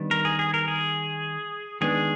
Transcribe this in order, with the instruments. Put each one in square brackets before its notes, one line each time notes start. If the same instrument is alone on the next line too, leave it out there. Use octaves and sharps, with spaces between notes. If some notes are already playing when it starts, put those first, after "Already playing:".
Already playing: [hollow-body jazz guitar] D#3 G3 B3 D4
[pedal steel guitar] A#4
G#4
G#4
A#4
G#4
[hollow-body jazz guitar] D#3 G#3 B3 D4 [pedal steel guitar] G#4